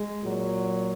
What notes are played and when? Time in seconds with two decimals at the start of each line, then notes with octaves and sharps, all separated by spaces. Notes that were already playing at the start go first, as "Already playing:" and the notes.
Already playing: G#3
0.22 A#2 F#3